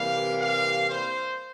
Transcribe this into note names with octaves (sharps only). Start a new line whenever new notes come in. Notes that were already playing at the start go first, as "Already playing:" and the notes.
Already playing: C3 E3 G3 A#3 F5
F5
C5